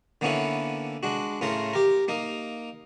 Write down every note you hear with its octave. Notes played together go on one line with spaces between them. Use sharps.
D3 A#3 B3 C#4 E4 C#5
G#3 D4 F#4
A2 C#3 A3 A#4 C6
G4 A#4
A#3 D#4 A#4